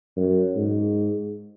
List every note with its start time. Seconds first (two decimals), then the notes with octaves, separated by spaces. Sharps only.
0.17 F#2
0.56 G#2